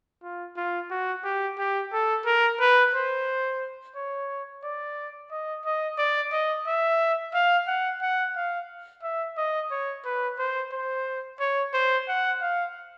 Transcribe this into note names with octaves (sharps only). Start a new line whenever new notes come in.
F4
F4
F#4
G4
G4
A4
A#4
B4
C5
C#5
D5
D#5
D#5
D5
D#5
E5
F5
F#5
F#5
F5
E5
D#5
C#5
B4
C5
C5
C#5
C5
F#5
F5